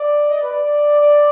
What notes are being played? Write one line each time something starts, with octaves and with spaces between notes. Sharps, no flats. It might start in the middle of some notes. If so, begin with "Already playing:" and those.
Already playing: D5
D#5
D5
B4
D5
D5
D5